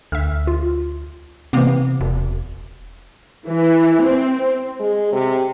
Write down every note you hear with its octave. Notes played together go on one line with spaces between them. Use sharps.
D2 E5 E6 F6
F4
C3 E3 A#3 B3
E1
E3
C4
G#3
C3